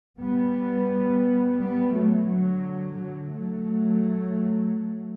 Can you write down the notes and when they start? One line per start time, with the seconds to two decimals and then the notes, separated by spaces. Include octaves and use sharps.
0.19 G3 B3
1.58 G3 B3
1.92 F#3 A3
2.27 D3 F#3
2.96 D3 F#3
3.31 F#3 A3